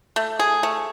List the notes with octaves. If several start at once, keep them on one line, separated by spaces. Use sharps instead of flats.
A3
G#4
A3